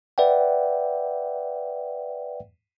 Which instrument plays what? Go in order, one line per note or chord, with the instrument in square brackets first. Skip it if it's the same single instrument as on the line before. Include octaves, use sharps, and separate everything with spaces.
[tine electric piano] B4 D5 E5 F#5 G5